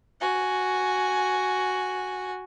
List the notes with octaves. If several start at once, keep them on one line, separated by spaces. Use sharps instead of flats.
F#4 G#5